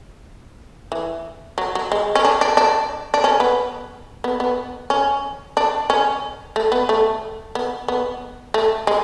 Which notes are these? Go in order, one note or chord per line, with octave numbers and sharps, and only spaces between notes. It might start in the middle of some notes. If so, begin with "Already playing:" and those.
E3
F#3
F#3
G#3
C#4
D4
D4
D4
D4
C#4
B3
B3
B3
C#4
D4
C#4
A3
B3
A3
B3
B3
A3
G#3